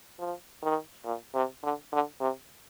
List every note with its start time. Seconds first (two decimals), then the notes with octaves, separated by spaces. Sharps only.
0.19 F3
0.62 D#3
1.05 A#2
1.34 C3
1.63 D3
1.92 D3
2.20 C3